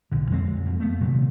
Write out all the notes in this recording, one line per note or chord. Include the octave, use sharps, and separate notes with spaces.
B1 D3
F2 G#3 C4
F2
A3 B3
D#1 C3 F#3